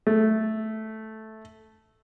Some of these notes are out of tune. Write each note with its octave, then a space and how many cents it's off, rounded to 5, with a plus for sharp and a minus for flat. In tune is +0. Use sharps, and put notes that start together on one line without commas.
A3 -5